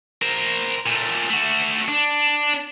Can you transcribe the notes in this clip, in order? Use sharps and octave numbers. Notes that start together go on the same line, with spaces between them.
A#4 C5
A#2 A3
A3 F#4
D4